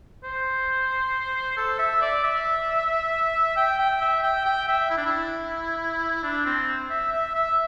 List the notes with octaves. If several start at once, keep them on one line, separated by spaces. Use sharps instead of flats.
C5
A4
E5
D5
E5
G5
G5
E5
G5
G5
E5
E4
D4
E4
D4
C4
E5
E5
E5